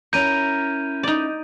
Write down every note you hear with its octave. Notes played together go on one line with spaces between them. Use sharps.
C#4 E4 A#4 G6 D#7
D#4 D5